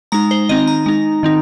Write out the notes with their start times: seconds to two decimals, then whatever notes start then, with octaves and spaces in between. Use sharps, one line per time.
0.12 G#3 D#4 A#5
0.31 C5
0.49 D#3 C4 D#4 D#5
0.67 A#5
0.86 G#3 D#4
1.23 D#3 C4 D#4